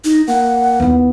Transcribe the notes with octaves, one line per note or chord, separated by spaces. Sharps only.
D#4
A#3 F#5
D#2 B3 E4